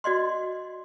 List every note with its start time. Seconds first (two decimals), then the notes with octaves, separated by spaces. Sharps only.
0.04 F#4 D5 D#5 C6